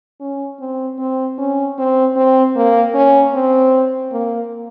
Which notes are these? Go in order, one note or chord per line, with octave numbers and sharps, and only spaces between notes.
C#4
C4
C4
C#4
C4
C4
A#3
C#4
C4
A#3